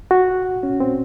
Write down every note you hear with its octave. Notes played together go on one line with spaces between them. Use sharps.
F#4
C#4
C4